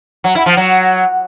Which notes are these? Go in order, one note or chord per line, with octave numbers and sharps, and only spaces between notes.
F#3
E4
F3
F#3